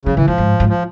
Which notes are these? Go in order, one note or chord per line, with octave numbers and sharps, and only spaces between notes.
C#3 F3
C#3 E3
G2 F3
G#2
G#2
F3